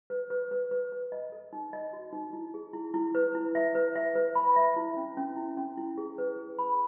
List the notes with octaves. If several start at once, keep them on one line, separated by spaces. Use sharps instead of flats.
B4
B4
B4
B4
B4
D#5
A4
D#4
D#5
F#4
D#4
E4
G#4
E4
E4
B4
E4
E5
B4
E5
B4
B5
E5
E4
C#4
C#4
E4
C#4
E4
G#4
B4
G#4
B5